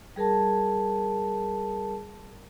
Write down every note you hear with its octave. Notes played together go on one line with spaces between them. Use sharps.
G3 G#4 A#4 A5